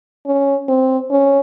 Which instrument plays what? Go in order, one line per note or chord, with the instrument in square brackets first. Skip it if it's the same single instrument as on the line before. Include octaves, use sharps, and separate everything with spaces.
[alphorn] C#4
C4
C#4